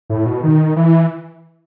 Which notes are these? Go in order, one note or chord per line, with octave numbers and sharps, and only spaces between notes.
A2
B2
D#3
E3